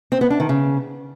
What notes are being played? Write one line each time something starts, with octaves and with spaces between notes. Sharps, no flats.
C4
B3
D4
D#3
C#3